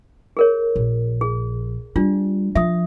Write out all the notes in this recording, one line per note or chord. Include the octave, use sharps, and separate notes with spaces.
G#4 A#4 C#5
A#1
G#4
G3 D4 F4
F3 E5 D#6